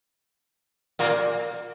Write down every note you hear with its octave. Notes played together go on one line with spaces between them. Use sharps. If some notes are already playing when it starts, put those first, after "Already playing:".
A#2 A#3